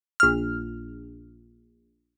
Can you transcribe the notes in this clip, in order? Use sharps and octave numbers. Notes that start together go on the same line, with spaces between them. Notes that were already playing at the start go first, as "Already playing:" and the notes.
A#1 F6